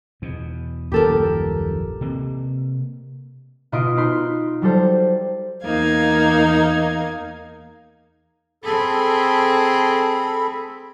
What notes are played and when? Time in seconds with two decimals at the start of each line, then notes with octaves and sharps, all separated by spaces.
0.22 E2 B2
0.92 D#1 A#1 F#2 G4 A4 A#4
2.01 C3 A#3
3.72 B2 E4 F4 D#5 C6 D7
3.96 D#4 B4 C6
4.62 F#3 G3 A4 C5
5.64 E2 A#3 D#4 F5 G#6
8.64 C4 G#4 A4 B5